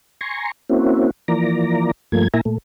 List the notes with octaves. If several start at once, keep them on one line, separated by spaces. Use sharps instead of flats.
G#5 A#5 C6 C#6
A#3 C4 C#4 E4 F#4
E3 F3 A#3 D5 A#5
G2 F3 A3 A#3 G#6
A#2 A#3 E4 E5 G#5 A#5
A#2 A3